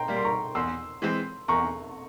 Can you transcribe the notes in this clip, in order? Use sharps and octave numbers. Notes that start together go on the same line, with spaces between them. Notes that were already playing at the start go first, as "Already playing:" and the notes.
Already playing: G5 A#5 C6
G3 A#3
C6
A#5 C#6
E2 C6 E6
E3 G#3 C4
E2 A#5 C#6